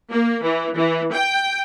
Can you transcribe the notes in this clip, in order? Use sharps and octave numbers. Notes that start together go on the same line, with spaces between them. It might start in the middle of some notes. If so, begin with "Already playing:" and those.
A#3
E3
E3
G5